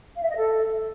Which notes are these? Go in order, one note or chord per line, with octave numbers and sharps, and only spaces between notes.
F5
E5
D#5
A4